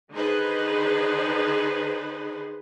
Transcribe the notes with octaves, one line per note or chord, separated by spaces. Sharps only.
D3 D#3 D#4 G#4 B4 C5